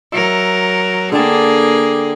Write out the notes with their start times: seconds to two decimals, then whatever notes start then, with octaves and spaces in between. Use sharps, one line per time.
0.12 F#3 A#4 E5
1.12 D3 A#3 G#4 G5 A5